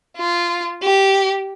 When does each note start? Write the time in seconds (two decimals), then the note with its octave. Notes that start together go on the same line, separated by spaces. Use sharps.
0.18 F4
0.83 G4